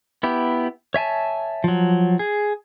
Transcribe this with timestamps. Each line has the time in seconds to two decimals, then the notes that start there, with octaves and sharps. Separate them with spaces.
0.23 B3 E4 G4
0.94 C#5 E5 G#5 A5
1.64 F3 F#3
2.19 G#4